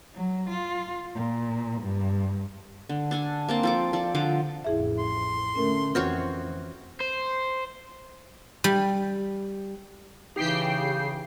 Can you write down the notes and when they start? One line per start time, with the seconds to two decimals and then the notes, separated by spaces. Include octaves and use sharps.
0.15 F#3
0.49 F4
1.15 A#2
1.81 G2
2.89 D3
3.11 D4 A4 G#5
3.49 A#3 C4 A5
3.63 F3 A4 D6
3.93 F3 A4 D5
4.15 D3 F3 D6
4.64 A1 F2 E4 G#4 E5
4.99 C6
5.56 D3 A3 C#4 A#4
5.95 F2 E3 C4 F#4 C#5 F6
7.00 C5
8.64 G3
10.36 C#3 E3 D#4 G4 G5 C7